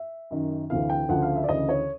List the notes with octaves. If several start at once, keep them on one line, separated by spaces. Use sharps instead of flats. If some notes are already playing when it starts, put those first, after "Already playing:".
Already playing: E5
F#2 D#3
D2 C3 E3 F5
G5
D2 C#3 F3 F#5
F5
E5
D5
D2 C#3 E3 D#5
C#5